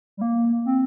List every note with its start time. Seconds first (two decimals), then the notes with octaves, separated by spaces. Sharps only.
0.17 G3
0.21 A#3
0.66 C4